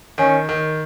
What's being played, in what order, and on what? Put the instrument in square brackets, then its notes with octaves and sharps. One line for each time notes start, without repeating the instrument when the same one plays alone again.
[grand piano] D#3 [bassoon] C#4
[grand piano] D#3